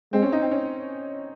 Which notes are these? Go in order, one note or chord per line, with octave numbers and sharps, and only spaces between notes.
G#3 C4
C#4
D#4
C4
C#4